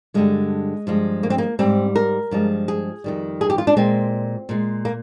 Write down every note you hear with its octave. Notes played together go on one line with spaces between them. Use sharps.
G2 D3 G3 G#3
G2 F3 G#3
A#3
C4
A#3
G#2 G3 C4
A#4
G2 F3 G#3
G#4
F2 D#3 G3
G#4
G4
F4
D4
A#2 G#3 C4
A#2 G#3
A#3